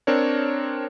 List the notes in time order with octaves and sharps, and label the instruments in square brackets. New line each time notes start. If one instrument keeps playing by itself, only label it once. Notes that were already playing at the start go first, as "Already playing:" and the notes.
[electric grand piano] C4 D4 A#4 C#5